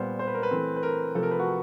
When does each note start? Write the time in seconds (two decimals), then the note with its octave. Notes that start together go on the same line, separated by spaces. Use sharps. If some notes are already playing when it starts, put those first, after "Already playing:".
Already playing: A#2 G3 B3 C5
0.19 C5
0.27 B4
0.34 A#4
0.43 B4
0.51 E3 A3 C4
0.76 B4
0.83 A#4
1.15 C3 F3 A3 A4
1.23 A#4
1.31 B4
1.39 F#4